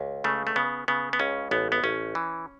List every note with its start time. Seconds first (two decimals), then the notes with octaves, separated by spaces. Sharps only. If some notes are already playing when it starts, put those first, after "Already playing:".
Already playing: C#2
0.24 C#3 A3
0.47 A3
0.56 C#3 B3
0.88 C#3 B3
1.13 B3
1.19 C#2 C#4
1.51 A1 B3
1.72 B3
1.84 A1 C#4
2.15 E3